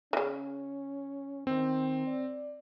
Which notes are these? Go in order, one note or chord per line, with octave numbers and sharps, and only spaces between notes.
C#3 E3 C#4
D#3 C4
D5